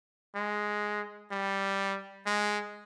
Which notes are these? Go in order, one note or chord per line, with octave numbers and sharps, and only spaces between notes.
G#3
G3
G#3